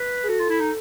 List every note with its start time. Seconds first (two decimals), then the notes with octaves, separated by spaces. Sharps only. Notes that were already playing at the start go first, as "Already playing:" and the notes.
Already playing: B4
0.23 G#4
0.29 F#4 A4
0.40 F4
0.50 E4
0.60 D#4